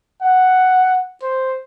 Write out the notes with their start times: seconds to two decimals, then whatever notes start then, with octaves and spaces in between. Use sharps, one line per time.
0.22 F#5
1.23 C5